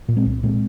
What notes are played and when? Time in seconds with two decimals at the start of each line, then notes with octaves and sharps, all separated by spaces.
0.08 A#2
0.17 G#3 C4
0.26 C2
0.43 A#2 G#3 C4